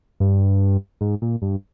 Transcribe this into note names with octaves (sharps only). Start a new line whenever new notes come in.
G2
G#2
A#2
G2